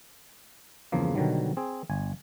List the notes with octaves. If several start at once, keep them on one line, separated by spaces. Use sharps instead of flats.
E2 G2 C#3 F3 A#3
B2 D3 D#3 F#3 G3
C4 G#4
G1 G#5